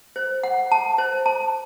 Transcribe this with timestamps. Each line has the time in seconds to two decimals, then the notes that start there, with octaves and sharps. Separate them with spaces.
0.16 C5
0.43 F#5
0.72 A5
0.98 C5
1.26 A5